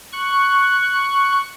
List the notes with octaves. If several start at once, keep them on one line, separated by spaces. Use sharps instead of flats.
C#6 F#6